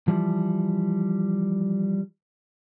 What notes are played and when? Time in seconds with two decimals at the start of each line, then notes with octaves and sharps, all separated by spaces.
0.08 E3 F3 G3